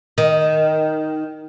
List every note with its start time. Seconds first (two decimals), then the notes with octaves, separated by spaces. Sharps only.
0.18 D#3